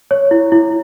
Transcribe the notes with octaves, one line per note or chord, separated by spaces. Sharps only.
C#5
E4
E4